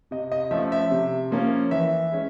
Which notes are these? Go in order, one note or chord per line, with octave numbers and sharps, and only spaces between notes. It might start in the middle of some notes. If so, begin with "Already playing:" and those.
C3 D#5
D#5
F3 A3 C#4 E5
E5
C3
F3 A#3 C#4
E3 E5
G#3 C#4